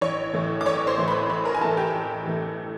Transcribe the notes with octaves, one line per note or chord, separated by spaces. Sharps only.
A1 C#5 C#6
A2 E3 A3
D6
A1 C#5 C#6
C5 C6
A2 E3 A3
B4 B5
A1 B4 B5
A#4 A#5
G#5
A2 E3 A3 A4 A5
G4 G5
A1
A2 E3 A3